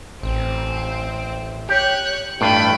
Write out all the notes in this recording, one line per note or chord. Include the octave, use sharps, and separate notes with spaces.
A1 C4
G4 C#5 F#6
A1 G2 A3 F4 G5 B5